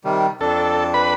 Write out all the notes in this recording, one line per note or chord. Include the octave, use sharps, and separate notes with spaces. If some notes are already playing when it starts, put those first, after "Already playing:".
C3 D#3 G3
F2 D4 A4
B4 B5